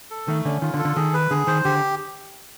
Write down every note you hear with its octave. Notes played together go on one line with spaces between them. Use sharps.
A4
D#3 A3
D3 C#4
D#3 F4
D3
A4
D3
D#3 G#4
B4
D3 G#4
D#3 C5
D3 G4